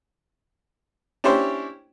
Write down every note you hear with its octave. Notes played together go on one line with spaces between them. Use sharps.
C#4 D4 E4 G4 C5 C#5